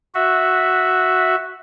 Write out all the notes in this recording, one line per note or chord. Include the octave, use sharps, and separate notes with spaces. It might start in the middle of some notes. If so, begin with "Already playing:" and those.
F#4 E5